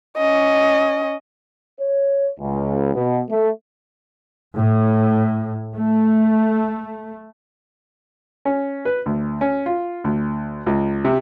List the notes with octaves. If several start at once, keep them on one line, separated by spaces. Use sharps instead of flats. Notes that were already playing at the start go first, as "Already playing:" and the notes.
C#4 D#5
C#5
C#2
B2
A3
A2
A3
C#4
B4
D2
C#4
F4
D2
C#2
C3